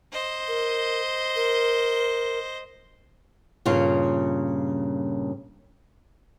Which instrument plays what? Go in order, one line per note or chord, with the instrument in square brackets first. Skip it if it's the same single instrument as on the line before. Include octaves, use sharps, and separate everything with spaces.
[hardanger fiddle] C5 D#5
[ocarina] A#4
A#4
[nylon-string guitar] G2 A#2 C#3 F4